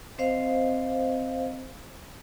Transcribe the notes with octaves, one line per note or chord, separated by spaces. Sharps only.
C4 C5 D#5 F5